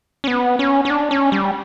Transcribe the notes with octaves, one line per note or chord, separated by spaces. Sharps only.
C#4
B3
C#4
C#4
D4
C#4
G3